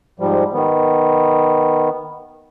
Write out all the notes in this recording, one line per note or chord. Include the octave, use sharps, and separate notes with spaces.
G#2 F3 G3
D#3 B3